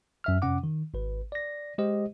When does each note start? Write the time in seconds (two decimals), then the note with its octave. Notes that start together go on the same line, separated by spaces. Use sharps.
0.24 F#2 E5 F6
0.42 F2 C3 C#4 F#5 D6
0.64 D#3
0.94 G#1 B4
1.32 D5 A#6
1.78 G#3 G4 C5 D#5